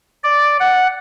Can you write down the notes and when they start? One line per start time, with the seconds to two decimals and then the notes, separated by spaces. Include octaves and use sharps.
0.24 D5
0.59 F#5